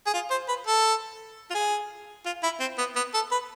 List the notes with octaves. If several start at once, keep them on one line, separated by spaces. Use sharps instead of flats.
G#4
F4
C5
B4
A4
F4
G#4
F4
E4
C4
B3
B3
A4
B4